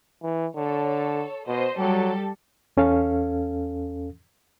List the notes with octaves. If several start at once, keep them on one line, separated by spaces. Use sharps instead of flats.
E3
D3 A4 C#5
B2 C5 D#5
F#3 G3 G4 A4
E2 C#4 A4 F5